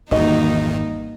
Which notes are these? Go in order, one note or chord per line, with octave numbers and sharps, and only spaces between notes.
G#1 E2 D#3 G3 A#3 D#4 F#4 D#5